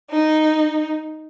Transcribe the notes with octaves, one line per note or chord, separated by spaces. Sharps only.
D#4